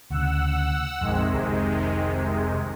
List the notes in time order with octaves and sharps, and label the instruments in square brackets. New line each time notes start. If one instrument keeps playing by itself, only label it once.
[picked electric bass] D2 C#3 [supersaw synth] F#5 E6
[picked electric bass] A#1 F2 [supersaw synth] C3 D#3 G#3
[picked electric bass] F1 C2